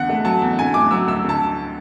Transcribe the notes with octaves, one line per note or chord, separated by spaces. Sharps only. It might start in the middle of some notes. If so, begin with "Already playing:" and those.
Already playing: E2 D3 F#5
A3
F#3 A5
E2
D3 G#5
A3 D6
F#3 E6
D2 E6
D3 A5